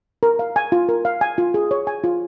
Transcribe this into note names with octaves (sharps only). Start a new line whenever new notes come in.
A#4
F5
G#5
F4
A#4
F5
G#5
F4
G#4
C#5
G#5
F4